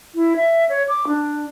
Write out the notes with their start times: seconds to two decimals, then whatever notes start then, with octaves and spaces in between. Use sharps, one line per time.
0.15 E4
0.36 E5
0.69 C#5
0.89 D6
1.07 D4